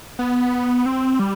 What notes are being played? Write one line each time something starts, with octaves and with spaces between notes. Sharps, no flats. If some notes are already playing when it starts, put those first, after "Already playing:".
B3
C4
G3